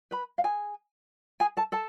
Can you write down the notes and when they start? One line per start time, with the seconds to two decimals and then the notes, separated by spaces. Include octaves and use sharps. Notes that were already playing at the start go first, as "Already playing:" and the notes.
0.11 B4 B5
0.38 F5
0.44 G#4 G#5
1.40 G#4 G#5
1.57 A4 A5
1.72 A4 A5